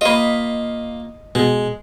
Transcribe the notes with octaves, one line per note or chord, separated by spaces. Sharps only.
A#3 F4 D#5 B5
B2 G#3